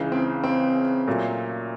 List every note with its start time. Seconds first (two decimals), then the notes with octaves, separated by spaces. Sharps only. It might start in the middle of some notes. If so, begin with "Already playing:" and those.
Already playing: C#2 C#3 E3
0.12 C4
0.44 C4
1.08 A#2 F#3 A3